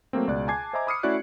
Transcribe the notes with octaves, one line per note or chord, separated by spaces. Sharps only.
F#3 A3 A#3 C4
C#2 B2 D5 F#6
G#5 A5 D6 G#6 C7
C5 D#5 E5 G#5 A#5 D6
B5 D6 D#6 F6 C7 C#7
A3 C#4 E4 F#4 D5 F#6